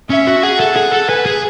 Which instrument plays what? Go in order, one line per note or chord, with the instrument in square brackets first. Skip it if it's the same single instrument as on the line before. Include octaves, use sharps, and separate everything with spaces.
[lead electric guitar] C#4 [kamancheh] E5
[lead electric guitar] F#4
[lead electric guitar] G#4 [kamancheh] F#5
[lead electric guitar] A4
G#4
A4
[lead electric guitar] B4 [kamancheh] G#5
[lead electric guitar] G#4